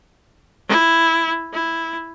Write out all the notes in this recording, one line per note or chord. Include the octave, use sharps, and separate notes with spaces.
E4
E4